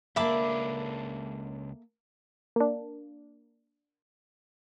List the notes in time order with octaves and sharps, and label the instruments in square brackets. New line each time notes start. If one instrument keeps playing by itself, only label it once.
[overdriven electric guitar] C#2 D4 [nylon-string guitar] A#3 A4 [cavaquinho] E5 B5 D6
[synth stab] A#3 D4